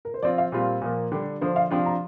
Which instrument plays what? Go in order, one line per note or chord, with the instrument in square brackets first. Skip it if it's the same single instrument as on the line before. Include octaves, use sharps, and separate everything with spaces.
[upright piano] A#4
C5
[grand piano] F3 C4 F4 [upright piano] D5
[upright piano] F5
[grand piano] A#2 G3 C4 F4
A#2 F3 A#3
[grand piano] D3 G3 D4 [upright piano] G4
[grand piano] D3 F3 D4 [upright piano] C5
[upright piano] F5
[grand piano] C3 F3 D4 F4 [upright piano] G5
[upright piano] A#5